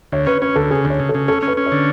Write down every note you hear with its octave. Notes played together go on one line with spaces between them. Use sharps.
D2 C#5
C#4 B4
C#4 B4
D2 A4
C#3 G#4
D2
C#5
C#3
A4
C#3
C#4 A4
C#4
B4
C#4
C#5
D3